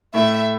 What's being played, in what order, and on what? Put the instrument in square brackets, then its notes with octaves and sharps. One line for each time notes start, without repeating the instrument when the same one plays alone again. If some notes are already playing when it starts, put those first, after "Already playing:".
[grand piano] A2 A3 E4 [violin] E5